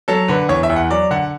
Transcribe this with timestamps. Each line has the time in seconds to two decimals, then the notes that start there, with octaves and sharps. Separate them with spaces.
0.08 F#3 A4
0.28 D3 B4
0.49 E2 C#5
0.63 E5
0.70 E2
0.76 F#5
0.91 F#3 D5
1.11 D3 F#5